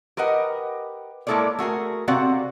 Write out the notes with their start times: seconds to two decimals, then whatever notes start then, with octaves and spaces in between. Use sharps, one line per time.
0.17 G4 A#4 B4 D#5 F#5
1.27 G#3 A#3 E4 A4 C#5 D5
1.59 A3 F#4 G#4 A#4
2.08 C3 C4 F#4 D5 F5 F#5